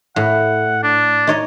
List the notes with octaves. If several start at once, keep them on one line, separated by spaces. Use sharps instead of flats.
A2 F#5
D4
D#4 C#5 D#5